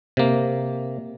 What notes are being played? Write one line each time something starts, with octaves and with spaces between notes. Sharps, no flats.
C3 A#3